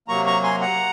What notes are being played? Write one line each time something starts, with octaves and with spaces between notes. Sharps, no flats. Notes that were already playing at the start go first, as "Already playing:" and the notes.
C3 F#3 A#3 A#5 C#6
A#5 C#6
G#5 C6
F#5 A#5